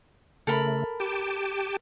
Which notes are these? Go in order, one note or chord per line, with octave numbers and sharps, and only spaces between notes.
C#3 A3 A4 A#4 B5
G4 G5 A5